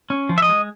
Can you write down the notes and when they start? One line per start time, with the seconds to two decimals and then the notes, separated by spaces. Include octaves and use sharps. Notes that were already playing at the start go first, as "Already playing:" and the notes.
0.10 C#4
0.29 F3
0.38 E5
0.42 D#5
0.49 G#3